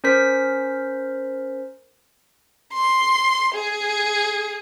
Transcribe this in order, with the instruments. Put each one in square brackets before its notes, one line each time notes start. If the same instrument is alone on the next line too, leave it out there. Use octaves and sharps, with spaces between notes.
[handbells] C#4 A#4 C5 B6
[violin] C6
G#4